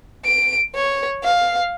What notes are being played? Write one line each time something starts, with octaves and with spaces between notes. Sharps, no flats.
D7
C#5
F5